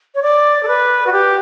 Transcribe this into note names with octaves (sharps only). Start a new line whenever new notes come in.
C#5
D5
A4
B4
F#4
G4